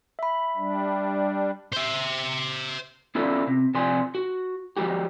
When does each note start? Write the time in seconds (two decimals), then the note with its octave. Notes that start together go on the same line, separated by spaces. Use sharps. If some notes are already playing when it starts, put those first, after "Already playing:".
0.19 E5 B5
0.56 G3 D4
1.73 C5 E5
3.15 B3 C#4 E4 F4 A4 D5
3.47 C3
3.74 C3 F3 D5 G#5 C6
4.15 F#4
4.77 F3 G#3 F#4 G4